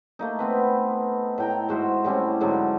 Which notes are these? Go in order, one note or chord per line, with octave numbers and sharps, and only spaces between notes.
A3 A#3 D#4
B3 C4 B4
A2 G5 A#5
G#2 F#4 C5 E5
A2 G3 C4 C#4
G#2 D3 F#3